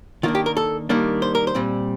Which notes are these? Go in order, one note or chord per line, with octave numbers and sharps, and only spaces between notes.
D#3 A#3 D4 F4
G4
A#4
A4
D#3 G3 A#3 D4
C5
A#4
C5
A#2 G3 C4